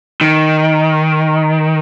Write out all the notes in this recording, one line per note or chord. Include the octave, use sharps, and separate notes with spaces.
D#3